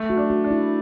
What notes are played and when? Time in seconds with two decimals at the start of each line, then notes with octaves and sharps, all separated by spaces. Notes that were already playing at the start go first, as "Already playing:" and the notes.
Already playing: A3
0.10 F#4
0.17 D4
0.30 F#4
0.44 D4
0.51 E4